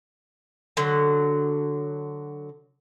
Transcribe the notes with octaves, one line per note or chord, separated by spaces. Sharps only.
D3 F#3